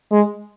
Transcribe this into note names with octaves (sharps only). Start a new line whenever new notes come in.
G#3